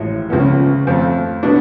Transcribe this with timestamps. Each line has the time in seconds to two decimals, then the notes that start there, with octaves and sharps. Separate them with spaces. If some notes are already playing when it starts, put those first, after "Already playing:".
Already playing: A1 A2 F3 G#3
0.30 C#2 C#3 F3 B3
0.87 F2 F3 A3
1.43 B2 F#3 B3 D4